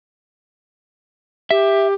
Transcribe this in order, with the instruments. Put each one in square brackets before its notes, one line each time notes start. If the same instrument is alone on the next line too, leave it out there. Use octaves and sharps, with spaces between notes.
[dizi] G4 [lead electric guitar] E5